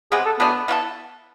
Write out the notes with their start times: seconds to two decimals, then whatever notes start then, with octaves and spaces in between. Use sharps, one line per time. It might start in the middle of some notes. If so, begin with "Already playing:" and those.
0.12 C3 G#3 B3 G#4
0.26 A4
0.39 B2 A3 B3 D4 G#4
0.68 E3 B3 F4 A4